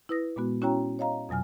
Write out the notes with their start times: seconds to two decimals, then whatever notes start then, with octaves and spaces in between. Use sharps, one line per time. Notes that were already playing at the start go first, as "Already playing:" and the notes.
0.09 E4 B4 D#6 A#6
0.36 A#2 G#3 B3 F#4
0.62 C#4 E4 F#4 C#5 G5 A#5
0.99 C#5 D#5 F5 A#5
1.29 F2 B2 F#3 G#5 F6